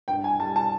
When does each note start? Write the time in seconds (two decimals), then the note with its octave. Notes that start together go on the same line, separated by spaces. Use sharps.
0.08 G2 G5
0.24 G#5
0.39 G3 A5
0.56 A5